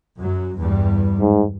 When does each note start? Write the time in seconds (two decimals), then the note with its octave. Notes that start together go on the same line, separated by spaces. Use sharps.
0.18 F#2 F#3
0.58 E2 G2 G3
1.21 G#2